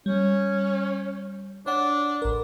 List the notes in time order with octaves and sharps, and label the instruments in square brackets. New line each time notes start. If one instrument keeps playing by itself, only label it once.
[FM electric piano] G3 [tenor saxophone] C#4
[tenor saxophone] D4 [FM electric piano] C#5 F#5
[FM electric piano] A1 A#4